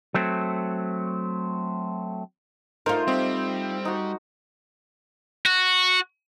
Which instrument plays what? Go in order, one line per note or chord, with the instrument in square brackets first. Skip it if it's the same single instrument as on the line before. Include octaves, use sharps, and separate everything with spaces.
[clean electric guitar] F#3 A3 C4
[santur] A3 C5 [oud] D#4 F4 [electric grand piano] A#4
[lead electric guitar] G3 [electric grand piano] C4 [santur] D#5
[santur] D#4 F#4
[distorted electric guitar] F#4